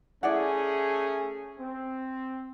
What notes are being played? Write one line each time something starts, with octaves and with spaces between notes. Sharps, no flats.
A3 C#4 E4 G#4 D5 F#5
C4